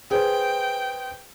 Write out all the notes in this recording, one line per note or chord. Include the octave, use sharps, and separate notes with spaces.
G#4 B4 C5 G5